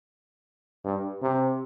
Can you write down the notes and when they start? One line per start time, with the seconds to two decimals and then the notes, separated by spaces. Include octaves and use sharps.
0.85 G2
1.22 C3